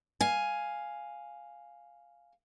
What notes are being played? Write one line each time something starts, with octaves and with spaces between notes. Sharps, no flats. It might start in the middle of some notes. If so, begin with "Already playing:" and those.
F5 G#5